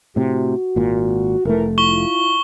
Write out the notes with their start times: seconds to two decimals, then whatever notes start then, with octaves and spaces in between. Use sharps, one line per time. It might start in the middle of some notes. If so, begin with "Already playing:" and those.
0.16 A2 C3 F#4
0.76 G#1 A#2
1.45 F1 E3 A3 A#4
1.78 E4 F4 C#6 G7